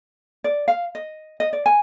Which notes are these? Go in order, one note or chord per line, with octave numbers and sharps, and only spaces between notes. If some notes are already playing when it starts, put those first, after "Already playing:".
D5
F5
D#5
D#5
D5
G#5